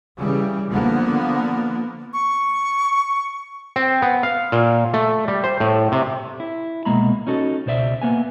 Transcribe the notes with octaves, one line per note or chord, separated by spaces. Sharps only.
C#3 E3 G3
D3 F3 A#3 B3
C#6
C4
B3
F5
A#2
A3
G3
C5
A2
C3
E4
C2 B2 G#3 A#3 A#5 B5
C#4 D#4 F#4 A4
C#2 B2 C5 D5 E5
A#3 B3 G#5